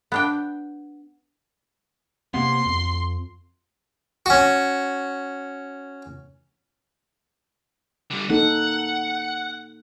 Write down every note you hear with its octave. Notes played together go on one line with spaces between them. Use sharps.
B3 D4 G5
C3 A#3 B3 C6
F2
C#4 F#4
D3 G3
A#3 D#4 A4 F#5